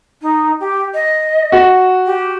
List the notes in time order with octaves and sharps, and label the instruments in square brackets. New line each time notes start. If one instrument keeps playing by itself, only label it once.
[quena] D#4
G4
D#5
[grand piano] F#4
[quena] G4